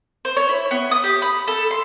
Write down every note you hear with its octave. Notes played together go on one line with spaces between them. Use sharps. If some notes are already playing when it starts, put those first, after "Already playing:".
C5
C#5
E4
B3
D#6
G4
B5
A4
C6